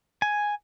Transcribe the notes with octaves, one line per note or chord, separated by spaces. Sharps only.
G#5